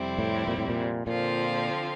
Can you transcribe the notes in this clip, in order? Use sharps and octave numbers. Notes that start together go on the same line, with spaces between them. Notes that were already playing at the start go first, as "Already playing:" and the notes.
Already playing: F2 C3 G3 C4 E4
A2
A#2
A2
A#2
A#2 D3 F3 C4 F4